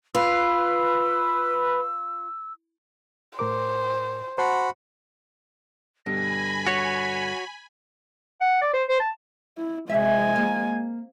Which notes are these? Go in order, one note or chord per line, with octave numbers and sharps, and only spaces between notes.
F4 B4 E6
A2 A#4 C5 D6
F#4 C5 F#5 A5 B5 C6
G2 B2 D3 G#5 B5 A#6
F#4 C#5 B6
F#5
D5
C5
C5
A5
E4
C3 G#3 E5 G#5
A#3